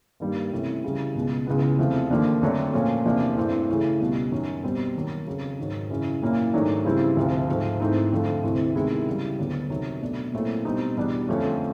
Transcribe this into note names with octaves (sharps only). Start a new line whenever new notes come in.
G2 D#3 G3 A#3
C3 E3 A3 C#4
C#3 E3 G3
C#2 B2 G#3
C#2 C#3 E3 G#3 B3
E2 C3 F3 A3 C4
D#2 D3 F3 A#3 D4
F2 D3 F#3 A3 D4
A#2 F3 A3 C#4
E2 C3 F3 A#3 D4
G2 E3 A3 C4
C#3 E3 A3 C#4
C#2 B2 G3
F#2 D#3 F#3
B2 G3 C4
D#2 D#3 F#3
F2 C#3 F#3
G#2 D#3 F#3
F#2 C#3 E3
A#2 F#3 A#3 C#4 E4
G#2 D#3 F#3 A3 D4
C#3 E3 G3 C4 E4
D2 C3 F3
G#2 F3 A3
G#2 E3 A3 C4
F2 D3 F3 A3
D2 C3 E3 A3 C4
C3 D#3 G#3 B3 E4
C#3 E3 G3
D2 D3 F#3 B3 D4
F2 C3 D#3 F#3
B2 F#3 A3 D4
A#2 F#3 A3 C4 E4
B2 G3 C4 D#4
E2 B2 G3 B3 D4
F2 D3 F3 A3 C#4